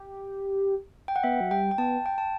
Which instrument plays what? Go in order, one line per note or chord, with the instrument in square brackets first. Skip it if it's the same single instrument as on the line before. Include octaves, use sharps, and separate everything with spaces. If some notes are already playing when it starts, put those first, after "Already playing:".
Already playing: [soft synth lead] G4
[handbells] G5
F#5
[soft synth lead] B3 [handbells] E5
[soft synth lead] F#3
[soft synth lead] G3 [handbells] G5
[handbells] G5
[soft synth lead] B3 [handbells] A5
[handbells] G5
A5